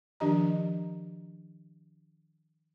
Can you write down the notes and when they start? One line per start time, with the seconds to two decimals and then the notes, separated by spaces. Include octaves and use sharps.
0.20 D#3 F3 D4 G4 D#5 A#5